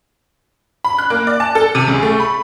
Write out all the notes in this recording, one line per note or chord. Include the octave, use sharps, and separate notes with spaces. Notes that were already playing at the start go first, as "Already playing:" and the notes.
B5
F#6
A#3
D5
A5
A4
C3
C#2
A3
B5